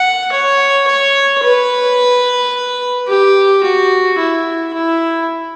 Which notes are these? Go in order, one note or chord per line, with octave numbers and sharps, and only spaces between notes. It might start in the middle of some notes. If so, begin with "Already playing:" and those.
Already playing: F#5
C#5
C#5
B4
G4
F#4
E4
E4